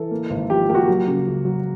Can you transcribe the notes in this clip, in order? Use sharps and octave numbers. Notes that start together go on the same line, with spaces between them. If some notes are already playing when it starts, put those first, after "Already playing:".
Already playing: E3 A4
A#3
G#1
F3 G4
A#3 G4
F#4
F#3
C#3
C#2
F#3